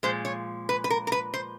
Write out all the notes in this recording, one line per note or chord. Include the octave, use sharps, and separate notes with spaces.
A#2 F3 G#3 C5
C#5
B4
B4
A#4
A#4
B4
C5